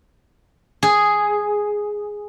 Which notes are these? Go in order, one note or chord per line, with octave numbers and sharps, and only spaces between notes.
G#4